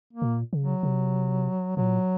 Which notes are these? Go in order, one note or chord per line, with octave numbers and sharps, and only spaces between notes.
A#3
A#2
C#3
F#3
C3
A#2 F#3